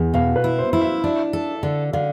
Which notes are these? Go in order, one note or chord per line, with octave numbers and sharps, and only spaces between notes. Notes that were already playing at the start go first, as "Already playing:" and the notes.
Already playing: E2
B2 F5
B4
E4
C5
E4
E5
D4
A4
D3
D3 F5